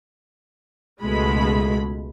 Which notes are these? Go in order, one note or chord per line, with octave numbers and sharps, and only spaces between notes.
C#2 B2 G#3 A3 B5